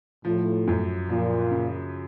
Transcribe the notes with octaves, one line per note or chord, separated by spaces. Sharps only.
A2 F3
F#2
A#2 F3
C#3